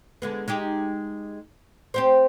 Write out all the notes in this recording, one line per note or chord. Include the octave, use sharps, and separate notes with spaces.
D3 G#3 B3
G#3 D#4 G4
C4 G4 C5